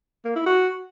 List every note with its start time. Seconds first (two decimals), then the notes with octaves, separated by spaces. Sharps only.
0.25 A#3
0.36 E4
0.46 F#4